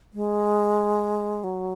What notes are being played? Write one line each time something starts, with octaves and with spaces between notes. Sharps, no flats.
G#3
F#3